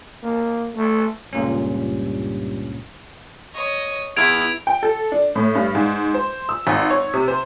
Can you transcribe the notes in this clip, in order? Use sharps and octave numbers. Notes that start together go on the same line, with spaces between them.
A#3
A3
C#2 G2 A#2 C#4
C#5 D#5
E2 E4 G#6 D7 F7
G5
A4
D4
A2
G2
G#2
C5
E6
G#1
C#5
C3
C5